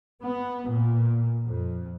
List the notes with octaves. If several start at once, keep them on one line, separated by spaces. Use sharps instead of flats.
B3
A#2
F2